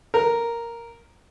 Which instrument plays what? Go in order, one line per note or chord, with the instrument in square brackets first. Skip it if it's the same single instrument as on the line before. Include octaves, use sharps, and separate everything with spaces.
[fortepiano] A#4